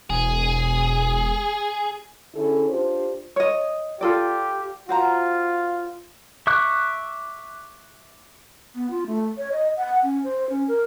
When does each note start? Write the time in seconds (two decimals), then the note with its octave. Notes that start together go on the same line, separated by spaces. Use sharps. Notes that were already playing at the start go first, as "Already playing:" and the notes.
0.10 E1 G#4
2.35 D3 C#4 E4 G#4 A4
2.68 D4 F4 G4 C5
3.36 C#5 D#5
4.01 F4 G4 A4 D5
4.89 F4 F#4 C5 A#5
6.47 E5 C#6 D6 F#6
8.75 B3
8.90 F4
9.07 A3
9.37 C#5
9.52 D#5
9.77 F#5
10.03 C#4
10.24 C5
10.50 C#4
10.68 A#4